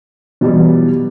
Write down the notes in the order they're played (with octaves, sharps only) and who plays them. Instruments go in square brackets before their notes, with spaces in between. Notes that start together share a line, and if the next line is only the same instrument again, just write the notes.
[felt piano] B2 F#3 G3 [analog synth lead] E3